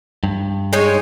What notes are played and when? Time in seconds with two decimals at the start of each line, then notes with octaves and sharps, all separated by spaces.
0.24 G2
0.73 G#3 D#4 C#5